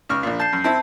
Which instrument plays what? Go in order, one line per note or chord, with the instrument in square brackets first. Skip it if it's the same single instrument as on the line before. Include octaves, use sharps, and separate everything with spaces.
[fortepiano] C#2 C#6 F6
A#1 A#2
[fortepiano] A5 [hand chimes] G6 C7
[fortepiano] F#2
[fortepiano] C4 E4 [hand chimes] A5